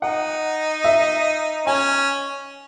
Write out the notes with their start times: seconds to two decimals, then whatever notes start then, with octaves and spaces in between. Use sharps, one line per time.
0.02 D#4 F#5
0.84 E5
1.66 C#4 G#5